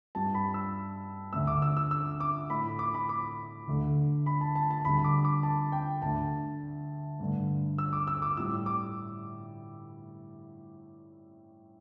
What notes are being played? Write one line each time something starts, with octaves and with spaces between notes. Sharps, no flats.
G2 G3 A5
B5
E6
D2 D3 A3 E6
D6
E6
E6
E6
D6
A2 A3 B5
D6
B5
D6
D2 D3 A3
B5
A5
A5
A5
D2 D3 G3 B5
D6
D6
A5
G5
D2 D3 A3 A5
G2 D3 A3
E6
D6
E6
D6
A2 G3 E6
D6